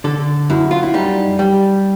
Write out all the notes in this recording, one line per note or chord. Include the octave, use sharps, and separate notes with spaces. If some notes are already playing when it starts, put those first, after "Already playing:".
D3 A4
F#2 E4
F4
E4
G3 D#4
G3